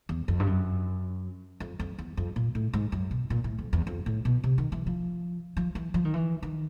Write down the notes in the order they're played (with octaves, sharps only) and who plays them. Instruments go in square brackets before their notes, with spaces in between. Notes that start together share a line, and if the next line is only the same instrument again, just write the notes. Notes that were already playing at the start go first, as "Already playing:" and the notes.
[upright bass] E2
F2
G2
F#2
F2
F2
E2
F2
A#2
A2
G#2
F#2
B2
A#2
A2
F2
E2
F2
A2
B2
C3
D#3
E3
F3
F3
E3
F3
D#3
E3
D#3